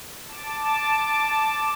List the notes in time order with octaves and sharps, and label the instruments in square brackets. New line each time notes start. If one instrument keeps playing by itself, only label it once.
[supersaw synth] A5 D6